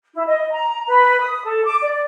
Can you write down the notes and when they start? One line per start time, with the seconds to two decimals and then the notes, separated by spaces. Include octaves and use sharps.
0.15 E4
0.26 D#5
0.52 A#5
0.88 B4
1.21 D#6
1.44 A4
1.65 D6
1.82 D5